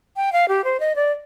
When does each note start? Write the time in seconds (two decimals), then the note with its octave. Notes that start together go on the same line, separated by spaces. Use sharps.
0.16 G5
0.33 F5
0.48 G4
0.64 C5
0.80 D#5
0.96 D5